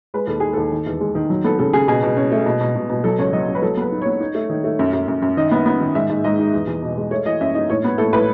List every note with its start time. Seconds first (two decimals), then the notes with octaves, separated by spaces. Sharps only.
0.14 G#3 B4
0.27 D#2 A4
0.40 D#4 G#4
0.53 D#2 A4
0.72 D#3
0.86 E2
1.01 G#3
1.15 D#3
1.30 F#3
1.44 B3 A4
1.59 C#3 A4
1.73 C#3 G#4
1.88 B2 G#4
2.03 B2
2.17 C#4
2.32 A3
2.46 B2
2.61 B2
2.76 B2
2.90 B2
3.04 F#3 A4
3.19 C#2 C#5
3.33 F#3 D#5
3.48 C#2
3.55 B4
3.62 F#3 A4
3.77 B3 B4
3.92 D#4
4.02 B3 C#5
4.20 D#4
4.35 A3
4.50 D#3
4.64 A3
4.79 F#2
4.93 F#2
5.08 F#2
5.22 F#2
5.37 D#3 D#5
5.51 B3
5.66 B3
5.80 D#3
5.95 G#2 E5
6.10 G#2
6.24 G#2 D#5
6.39 D#4
6.53 E2
6.67 E2
6.82 B2
6.97 G#3
7.11 A3 C#5
7.26 E3 D#5
7.41 F#2 E5
7.55 D#4 D#5
7.70 A2 C#5
7.84 B3
7.98 A2 A4
8.13 A2 B4